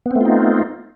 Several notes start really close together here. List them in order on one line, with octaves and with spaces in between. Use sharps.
B3 C4 A3 F4 D#4